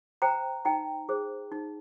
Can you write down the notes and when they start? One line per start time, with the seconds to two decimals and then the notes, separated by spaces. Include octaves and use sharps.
0.22 C5 G5 A#5
0.65 D#4 G5 A#5
1.09 G#4 C5
1.52 D#4